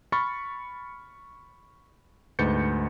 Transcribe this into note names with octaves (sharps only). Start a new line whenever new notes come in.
B5 C#6 F6 A6 C#7
D2 G#2 B4 G6 A6 C#7